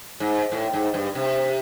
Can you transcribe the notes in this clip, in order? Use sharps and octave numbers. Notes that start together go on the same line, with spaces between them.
G#2
A2
G#2
G2
C3